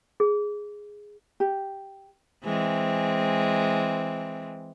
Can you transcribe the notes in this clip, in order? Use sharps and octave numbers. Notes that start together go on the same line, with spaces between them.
G#4
G4
E3 G#3 C4